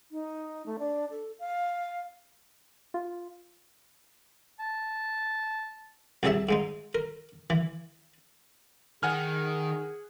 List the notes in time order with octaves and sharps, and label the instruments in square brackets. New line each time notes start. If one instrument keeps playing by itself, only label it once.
[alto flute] D#4
A3
D4
A4
F5
[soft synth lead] F4
[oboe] A5
[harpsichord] C2 C3 F#3 G#4 E5 A5
G#2 G#3 D#4
A#4
E3
[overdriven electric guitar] D#3 [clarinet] G#4 [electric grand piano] F#5 G#5 F6